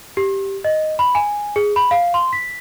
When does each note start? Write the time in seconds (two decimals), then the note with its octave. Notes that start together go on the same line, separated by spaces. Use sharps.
0.17 G4
0.64 D#5
0.99 B5
1.15 G#5
1.56 G#4
1.76 B5
1.91 F5
2.14 C6
2.33 B6